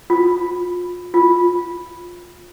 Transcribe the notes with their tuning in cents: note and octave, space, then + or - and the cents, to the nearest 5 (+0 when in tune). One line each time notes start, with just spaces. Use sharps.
F4 +30
F4 +15